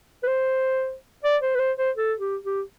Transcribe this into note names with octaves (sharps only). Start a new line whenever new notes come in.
B4
C5
D5
C5
B4
C5
C5
A4
G4
G4